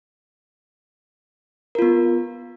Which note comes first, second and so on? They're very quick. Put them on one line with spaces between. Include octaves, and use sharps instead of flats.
A#4 F4 B3